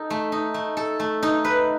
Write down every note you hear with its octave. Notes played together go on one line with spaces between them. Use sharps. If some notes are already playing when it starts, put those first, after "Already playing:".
Already playing: D#4 A4 D#5
A3
D#4
A3
A4
A3
D#4
B4